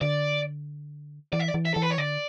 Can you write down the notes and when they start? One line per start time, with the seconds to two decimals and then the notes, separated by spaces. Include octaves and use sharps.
0.01 D3 D5
1.33 E3 D5
1.40 E5
1.48 D5
1.54 E3
1.65 E5
1.74 E3 A4
1.82 B4
1.90 C#5
1.98 D3 D5